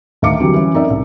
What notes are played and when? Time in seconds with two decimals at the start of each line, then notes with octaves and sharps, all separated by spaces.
0.22 D2 D#3 E5 F5 D6 C#7
0.40 D3 E3 F#3 G3 C4
0.54 E3 C#4
0.74 F#2 C4 D#4 A#4 D5 E5
0.90 C2